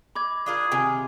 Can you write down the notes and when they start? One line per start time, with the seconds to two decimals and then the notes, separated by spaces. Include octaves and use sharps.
0.15 D#5 B5 D6 G#6
0.46 D4 F4 G#4 A#4
0.72 C3 D#3 F4 G5 G#5